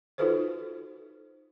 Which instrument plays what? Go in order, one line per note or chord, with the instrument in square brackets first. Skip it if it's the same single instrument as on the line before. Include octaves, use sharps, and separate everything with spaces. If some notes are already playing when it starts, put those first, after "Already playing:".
[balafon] D#4 F4 F#4 A4 B4 C5